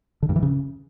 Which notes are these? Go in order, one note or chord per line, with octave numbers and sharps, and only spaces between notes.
D3
G2
E3
C#3